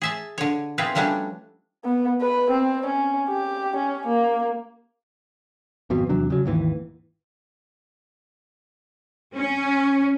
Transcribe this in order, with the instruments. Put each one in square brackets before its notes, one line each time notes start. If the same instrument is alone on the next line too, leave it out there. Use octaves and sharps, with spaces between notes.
[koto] G#4 E5 A5
D3 C#5
B3 C4 E4 F4 G#4 B4
F3 G3 A3 C#4 D4 F#4
[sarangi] B3
B4
C4
C#4
G4
C#4
A#3
[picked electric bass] G#1 F2 B2
E2 C3 F#3 D4
C#3 F#3
G#1 D#2 E3
[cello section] C#4